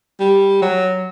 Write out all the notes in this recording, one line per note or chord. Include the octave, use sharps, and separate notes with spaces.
G3
F#3